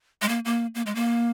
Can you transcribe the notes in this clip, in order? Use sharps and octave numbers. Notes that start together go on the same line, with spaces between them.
G#3
A#3
A#3
A#3
G#3
A#3